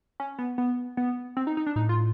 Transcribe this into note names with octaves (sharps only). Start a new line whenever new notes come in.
C#4
B3
B3
B3
C4
D#4
D#4
D4
A2 D#4
F4